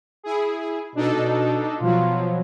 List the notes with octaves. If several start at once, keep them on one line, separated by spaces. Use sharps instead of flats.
E4 G#4
B2 D4 D#4 A4
B2
B2 F3 F#3 F4